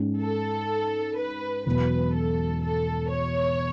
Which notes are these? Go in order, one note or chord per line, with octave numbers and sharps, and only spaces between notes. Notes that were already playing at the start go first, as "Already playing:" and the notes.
Already playing: G#2 G#3 C#4
A4
B4
E1 E2 B2 F#3 B4
A4
A4
C#5